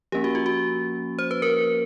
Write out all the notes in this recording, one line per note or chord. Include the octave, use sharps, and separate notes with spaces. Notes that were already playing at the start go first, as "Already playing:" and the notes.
F3 A#3 C#4 G4
F#4
F4
F#4
C5
B4
A#4